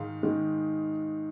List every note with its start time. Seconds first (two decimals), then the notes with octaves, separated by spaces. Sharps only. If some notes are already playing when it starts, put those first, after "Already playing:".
Already playing: G#2 D#3 G#3 F5
0.23 G#2 D#3 G#3